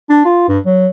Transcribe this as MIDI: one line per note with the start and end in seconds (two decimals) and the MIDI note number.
0.10 0.21 62
0.25 0.44 65
0.48 0.59 43
0.66 0.87 54